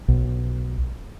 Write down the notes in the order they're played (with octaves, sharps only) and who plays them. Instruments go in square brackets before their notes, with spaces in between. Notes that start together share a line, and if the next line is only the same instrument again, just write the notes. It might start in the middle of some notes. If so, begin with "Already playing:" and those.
[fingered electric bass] B1